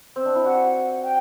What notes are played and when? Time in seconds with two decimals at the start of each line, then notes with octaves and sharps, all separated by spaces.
0.16 C4
0.25 D4
0.35 E4
0.45 F#4 F#5
1.03 G5